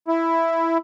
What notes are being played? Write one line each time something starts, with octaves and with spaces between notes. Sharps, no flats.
E4